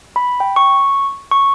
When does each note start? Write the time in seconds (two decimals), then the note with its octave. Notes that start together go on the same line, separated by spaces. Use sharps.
0.16 B5
0.40 G5
0.56 C#6
1.31 C#6